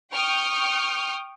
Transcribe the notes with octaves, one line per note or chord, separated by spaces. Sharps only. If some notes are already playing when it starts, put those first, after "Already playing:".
G5 C#6 D#6 F6 G6